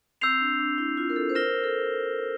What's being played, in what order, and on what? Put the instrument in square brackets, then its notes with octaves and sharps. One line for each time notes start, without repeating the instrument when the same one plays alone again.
[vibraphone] C4 [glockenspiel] E6 G6 C7 F7
[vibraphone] D4
D4
E4
F4
A#4
A4
C5
[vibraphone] A#4 [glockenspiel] F6 A#6 E7 G7
[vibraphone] A4